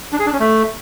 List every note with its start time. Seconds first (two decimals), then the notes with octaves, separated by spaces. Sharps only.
0.12 D4
0.19 G#4
0.26 D4
0.33 C#4
0.40 A3